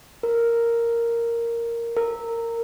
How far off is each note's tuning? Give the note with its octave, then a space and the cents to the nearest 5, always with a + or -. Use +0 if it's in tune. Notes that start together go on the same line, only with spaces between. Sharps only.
A#4 -5
A#4 -15